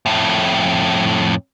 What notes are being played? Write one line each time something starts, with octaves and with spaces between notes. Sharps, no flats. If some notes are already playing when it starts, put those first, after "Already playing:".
F2 A2